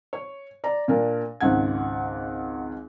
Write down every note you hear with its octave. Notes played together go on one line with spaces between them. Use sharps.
C#5
D5 A#5
A#2 D4 A#4
G#1 C#2 F#5 G#6